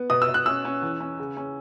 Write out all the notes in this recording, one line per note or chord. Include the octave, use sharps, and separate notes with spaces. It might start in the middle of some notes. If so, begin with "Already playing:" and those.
Already playing: B3
B2 D#6
E6
B2
F#6
C#4 E6
C#4
E2
C#4
C#3
C#4